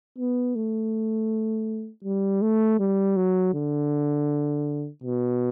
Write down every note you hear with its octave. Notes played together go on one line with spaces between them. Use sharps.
B3
A3
G3
A3
G3
F#3
D3
B2